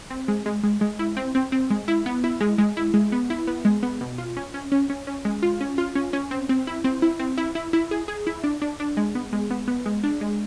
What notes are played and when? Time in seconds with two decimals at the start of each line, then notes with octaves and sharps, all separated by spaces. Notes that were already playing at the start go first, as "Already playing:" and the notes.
0.10 C4
0.28 G#3
0.46 G#3
0.63 G#3
0.81 G#3
0.99 E4
1.17 C4
1.35 C4
1.52 C4
1.70 G#3
1.88 E4
2.06 B3
2.24 E4
2.40 G#3
2.58 G#3
2.77 E4
2.94 G#3
3.12 B3
3.30 E4
3.47 B3
3.65 G#3
3.83 B3
4.01 B2
4.18 F4
4.37 C#4
4.54 C#4
4.72 C#4
4.90 C#4
5.07 C#4
5.25 G#3
5.43 F4
5.61 C#4
5.78 F4
5.95 C#4
6.13 C#4
6.31 C4
6.49 C4
6.67 E4
6.84 C4
7.02 E4
7.20 C4
7.37 E4
7.55 E4
7.73 E4
7.91 G#4
8.08 G#4
8.27 E4
8.44 D4
8.62 D4
8.80 D4
8.97 G#3
9.15 B3
9.33 G#3
9.51 B3
9.68 B3
9.86 G#3
10.03 D4
10.21 G#3